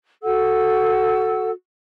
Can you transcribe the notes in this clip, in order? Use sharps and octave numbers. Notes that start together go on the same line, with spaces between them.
F#4 A4 F#5 E6